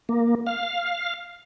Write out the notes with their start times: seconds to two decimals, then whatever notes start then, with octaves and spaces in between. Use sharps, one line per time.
0.09 A#3
0.47 F5